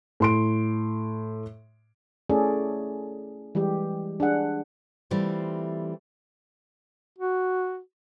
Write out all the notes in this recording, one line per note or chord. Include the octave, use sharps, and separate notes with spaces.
A2 C6 D7
A3 C#4 E4 G#4 A4 D5
E3 G3 G#3 G4
D4 G#4 F#5
E3 G3 A3 C4 F4
F#4